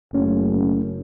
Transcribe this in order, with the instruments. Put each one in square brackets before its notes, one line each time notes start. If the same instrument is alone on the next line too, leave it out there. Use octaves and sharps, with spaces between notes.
[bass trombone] F#1 [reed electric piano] A3 C#4